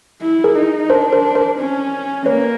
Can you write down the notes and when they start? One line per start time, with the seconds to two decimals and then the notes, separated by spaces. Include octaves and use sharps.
0.22 E4
0.44 G#4 A#4
0.55 D#4
0.89 D4 A#4 C5
1.13 A#4 C5
1.35 A#4 C5
1.58 C#4
2.26 A#3 B4 C#5